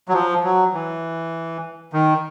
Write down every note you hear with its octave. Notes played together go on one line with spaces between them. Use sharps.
F#3
F3
F#3
E3
D#3